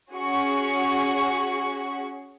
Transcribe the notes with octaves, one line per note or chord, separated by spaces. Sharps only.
C#4 F#4 G#4 C#6